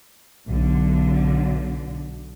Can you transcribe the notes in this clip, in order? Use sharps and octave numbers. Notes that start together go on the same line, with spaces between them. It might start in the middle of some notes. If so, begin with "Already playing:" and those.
B1 D3